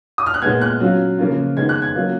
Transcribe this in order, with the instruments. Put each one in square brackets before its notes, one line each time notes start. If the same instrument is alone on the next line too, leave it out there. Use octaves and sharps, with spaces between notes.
[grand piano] D#6
F6
F#6
A#2 G#3 B3 G#6
F#6
F#3 C#4 F4
C#3 F3 A#3 C#4 F4
D#3 G#3 B3 D#4 G#6
F#6
G#6
F#3 A#3 C#4 F4